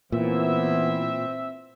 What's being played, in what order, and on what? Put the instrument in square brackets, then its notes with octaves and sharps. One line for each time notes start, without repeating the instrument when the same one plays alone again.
[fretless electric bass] A#2 [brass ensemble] E3 B3 E4 [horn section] C4 E5